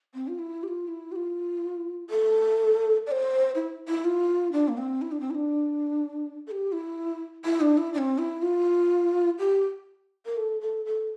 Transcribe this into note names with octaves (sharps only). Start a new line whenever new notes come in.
C4
F4
E4
G4
F4
E4
G4
F4
A4
D5
C5
E4
E4
F4
D4
A#3
C4
E4
D4
C4
E4
D4
A4
G4
E4
E4
D4
E4
D4
C4
E4
F4
G4
A#4
A4
A4
A4